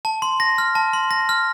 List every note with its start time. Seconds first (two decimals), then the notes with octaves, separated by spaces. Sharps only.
0.05 A5
0.22 C6
0.40 A#6
0.58 F6
0.75 A5
0.93 C6
1.11 A#6
1.29 F6